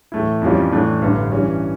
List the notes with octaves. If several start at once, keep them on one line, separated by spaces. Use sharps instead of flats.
A2 E3 A3 E4
F2 E3 G3 C#4 F4
A2 E3 A3 D4
A1 G2 D3
G2 E3 G3 C#4